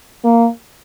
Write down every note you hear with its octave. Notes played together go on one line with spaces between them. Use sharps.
A#3